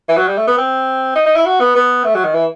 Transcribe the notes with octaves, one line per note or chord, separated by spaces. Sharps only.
E3
F#3
G3
A3
B3
C4
D#4
D#4
E4
F#4
B3
B3
A3
F#3
D#3
E3